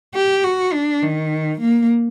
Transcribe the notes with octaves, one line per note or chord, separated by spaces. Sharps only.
G4
F#4
D4
D#3
A#3